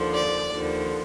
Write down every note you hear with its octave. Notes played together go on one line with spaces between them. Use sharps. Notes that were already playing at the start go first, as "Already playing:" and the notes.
Already playing: D#2 D3 F3
D5
D#2 D3 F3